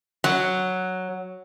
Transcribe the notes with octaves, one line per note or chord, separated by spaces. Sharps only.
F#3